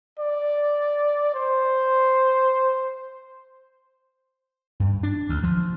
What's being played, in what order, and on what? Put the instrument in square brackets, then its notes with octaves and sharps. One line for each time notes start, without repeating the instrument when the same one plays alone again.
[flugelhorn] D5
C5
[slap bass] G2
D4
D2
F3